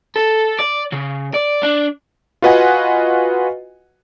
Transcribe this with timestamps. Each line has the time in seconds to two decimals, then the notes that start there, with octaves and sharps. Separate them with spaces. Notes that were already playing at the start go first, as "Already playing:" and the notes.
0.16 A4
0.59 D5
0.92 C#3
1.34 D5
1.63 D4
2.42 F4 F#4 B4 D#5 F#5 G#5